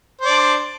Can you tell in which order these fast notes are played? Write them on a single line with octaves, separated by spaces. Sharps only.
C5 D5 D4